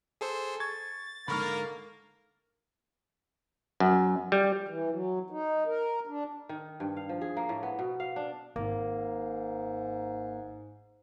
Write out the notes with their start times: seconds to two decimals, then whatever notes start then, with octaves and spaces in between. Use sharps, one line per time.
0.21 G#4 A4 C5
0.60 C#6 G#6 A6
1.28 G#2 D3 A#3 A#4 B5 C#6 F6
3.80 F#2
4.32 G3
4.68 E3
4.90 F#3
5.30 D#4
5.66 A#4
6.07 D4
6.49 D#3
6.80 G2
6.97 F5
7.09 F3
7.21 G#4
7.37 A#3
7.49 A2
7.63 B3
7.79 B2
8.00 F5
8.16 D4
8.56 G#1 G#2 A#3